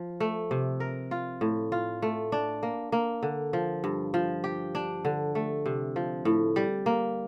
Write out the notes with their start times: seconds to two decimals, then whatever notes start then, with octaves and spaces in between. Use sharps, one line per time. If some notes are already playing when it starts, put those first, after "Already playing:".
Already playing: F3
0.20 A3
0.51 C3
0.80 A#4
1.11 F4
1.41 A2
1.72 F4
2.02 A3
2.32 D4
2.63 A#3
2.92 A#3
3.23 D3
3.53 F3
3.84 G2
4.14 F3
4.44 G4
4.75 D4
5.05 D3
5.35 A3
5.66 C3
5.96 F3
6.25 A2
6.56 G3
6.86 A#3